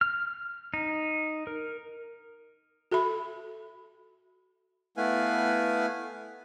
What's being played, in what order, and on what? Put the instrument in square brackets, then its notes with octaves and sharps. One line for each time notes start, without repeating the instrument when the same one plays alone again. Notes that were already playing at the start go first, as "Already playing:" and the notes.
[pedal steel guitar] F6
D#4
A#4
[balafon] F#4 A4 E5 B5
[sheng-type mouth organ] A3 B3 E4 B4 F5 G#5